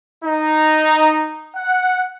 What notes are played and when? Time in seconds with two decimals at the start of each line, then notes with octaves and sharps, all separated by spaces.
0.25 D#4
1.56 F#5